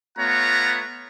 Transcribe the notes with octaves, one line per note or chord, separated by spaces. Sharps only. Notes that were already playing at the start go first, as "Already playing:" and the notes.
A3 B3 F4 C#5 F#5 A#5